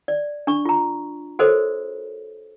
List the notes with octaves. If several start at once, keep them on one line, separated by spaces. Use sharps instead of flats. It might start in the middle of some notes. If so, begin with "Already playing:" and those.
D5
D4 C#6
F4 A#5
F#4 A4 A#4 C5 C#5 D#5